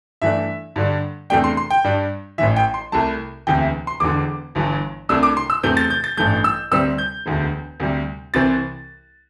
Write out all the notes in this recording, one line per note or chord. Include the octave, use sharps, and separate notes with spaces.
G2 E3 A3 D4 E5
G2 D3 G3 D4
E2 C3 A3 D4 G5
C6
C6
G5
G2 G3 D4
A1 A2 E3 E5
G5
C6
C2 C3 A3 A5
E1 D2 C3 E3 G5
E5
C6
E1 E2 D3 D6
G1 G2 E3
C2 C3 A3 D4 E6
D6
C6
E6
E2 C3 A3 C4 G6
A6
G6
A6
A1 G2 E3 A3 G6
E6
D2 C3 G3 C4 E6
G6
E1 D2 D3
D2 C3 G3
C2 C3 E3 C4 A6